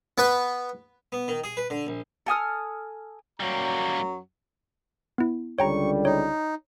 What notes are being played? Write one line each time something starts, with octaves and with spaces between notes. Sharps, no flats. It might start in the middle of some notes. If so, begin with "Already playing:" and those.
B3 B4
B3
D#3
G#4
B4
D3
A#1
A4 G#5 D#6 F6
F#2 F#3 G3 A#3 A#5
B3 E4
C#2 D3 G3 C#5 G5 A#5 C#6
D#4 C#5